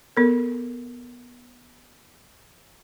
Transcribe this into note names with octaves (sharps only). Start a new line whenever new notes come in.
B3 A4 A#4